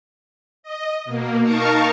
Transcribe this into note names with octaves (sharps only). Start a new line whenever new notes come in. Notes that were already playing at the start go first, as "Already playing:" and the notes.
D#5
B2 A#3
D#4 A#4 F5 A5 A#5 C#6